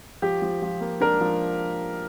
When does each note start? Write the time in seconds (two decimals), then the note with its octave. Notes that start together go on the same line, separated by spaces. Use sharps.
0.22 F3 G4
0.42 F3
0.62 F3
0.81 A#3
1.01 D4 A#4
1.21 F3